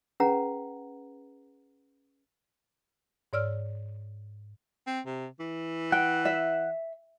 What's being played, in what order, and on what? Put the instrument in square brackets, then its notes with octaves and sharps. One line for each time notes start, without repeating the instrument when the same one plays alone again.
[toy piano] C#4 G#4 B4 F#5 A#5
[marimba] G#2 C#5 D5 E6 F6
[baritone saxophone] C4
C3
E3
[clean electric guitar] F#5 [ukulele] G5
[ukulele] E5